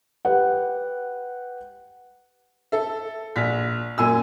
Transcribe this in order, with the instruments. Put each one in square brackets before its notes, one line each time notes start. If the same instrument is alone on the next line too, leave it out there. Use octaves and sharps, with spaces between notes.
[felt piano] G4 B4 F#5
[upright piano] A4 E5
A#1 B6
F#2 A#2 G#5 E6